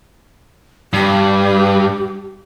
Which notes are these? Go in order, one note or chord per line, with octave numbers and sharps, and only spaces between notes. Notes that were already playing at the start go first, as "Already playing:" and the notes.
G2 G4